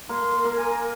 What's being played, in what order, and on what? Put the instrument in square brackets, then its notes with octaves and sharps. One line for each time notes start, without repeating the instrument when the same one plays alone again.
[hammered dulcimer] A#3 [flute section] C6
[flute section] A#4
[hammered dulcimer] A#3
[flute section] G#5